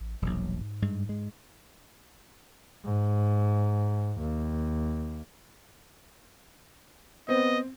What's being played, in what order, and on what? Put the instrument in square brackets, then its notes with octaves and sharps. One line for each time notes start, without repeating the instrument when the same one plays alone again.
[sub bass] A1
[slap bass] E1 A#1 [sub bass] F#3
[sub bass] G#2
[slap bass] G2 G#3
G#3
[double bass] G#2
D#2
[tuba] B3 [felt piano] C4 [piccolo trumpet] D#5